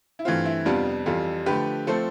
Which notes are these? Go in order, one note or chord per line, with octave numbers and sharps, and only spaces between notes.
E4
G2 E3 A3 C4 F4
E4
F2 C3 G3 B3 D4 F4
F2 E3 G3 F4 A4
D3 F3 A3 G4 B4
F3 A3 C4 A4 C5